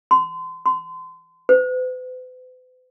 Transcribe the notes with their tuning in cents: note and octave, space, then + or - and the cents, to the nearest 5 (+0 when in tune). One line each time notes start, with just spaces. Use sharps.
C6 -35
C6 -35
B4 +45